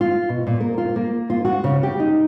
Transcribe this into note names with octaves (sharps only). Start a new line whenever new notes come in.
F4
B2
A#2
A#4
F4
A#3
F4
F#4
C#3
G4
D#4